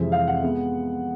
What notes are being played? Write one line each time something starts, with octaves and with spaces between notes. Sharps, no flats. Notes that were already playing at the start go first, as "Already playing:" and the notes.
Already playing: F2 C3 E3 G#3 C4 E5
F5
F#5
G#3 B3